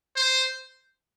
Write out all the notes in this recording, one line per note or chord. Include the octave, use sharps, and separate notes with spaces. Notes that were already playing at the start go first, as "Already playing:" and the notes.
C5